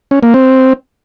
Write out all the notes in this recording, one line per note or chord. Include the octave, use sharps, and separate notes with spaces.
C#4
A#3
C4